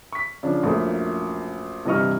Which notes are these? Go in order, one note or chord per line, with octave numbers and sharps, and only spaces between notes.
C#6 B6
C#3 F3 D4
A#1 F#2 A3 A#3
G2 C3 E3 D#5 C#6 F6